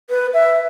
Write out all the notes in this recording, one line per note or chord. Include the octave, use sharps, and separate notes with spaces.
B4
E5